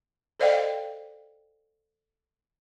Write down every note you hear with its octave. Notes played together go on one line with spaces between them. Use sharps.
A4 C5 D5 D#5 F5 G5